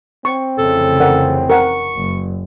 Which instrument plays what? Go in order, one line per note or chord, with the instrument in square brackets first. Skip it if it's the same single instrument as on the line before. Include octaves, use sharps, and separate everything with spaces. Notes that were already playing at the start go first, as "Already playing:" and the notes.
[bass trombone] C4 [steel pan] C#6
[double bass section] F1 C#3 E3 [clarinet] A4
[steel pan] A#4 D5 F#5
[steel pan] A#4 F#5 [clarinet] C#6
[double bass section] F#1